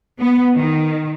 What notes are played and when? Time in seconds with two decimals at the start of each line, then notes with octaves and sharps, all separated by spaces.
0.19 B3
0.55 D#3